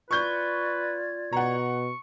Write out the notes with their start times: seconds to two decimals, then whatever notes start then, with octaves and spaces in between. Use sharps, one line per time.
0.11 F4 B4 D5 C#6 G6 G#6
1.33 B2 F#5 A#5 C#6